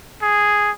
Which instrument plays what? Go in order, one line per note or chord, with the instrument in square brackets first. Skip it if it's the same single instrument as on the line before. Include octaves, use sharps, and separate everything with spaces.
[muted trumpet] G#4